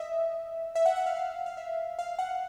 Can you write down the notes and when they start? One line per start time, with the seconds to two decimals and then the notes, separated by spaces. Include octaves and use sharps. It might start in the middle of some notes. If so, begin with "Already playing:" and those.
Already playing: D#5 E5
0.75 E5
0.86 F#5
0.96 F#5
1.06 F5
1.17 F5
1.46 F5
1.57 E5
1.99 F5
2.19 F#5